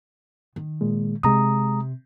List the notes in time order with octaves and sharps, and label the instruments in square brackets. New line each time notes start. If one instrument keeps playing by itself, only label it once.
[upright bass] D#3
[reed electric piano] A#2 G#3
[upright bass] C3 [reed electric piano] G#3 A#5 D#6